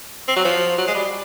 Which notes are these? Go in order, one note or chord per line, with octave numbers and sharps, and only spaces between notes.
C4
F#3
F3
F#3
G#3
G3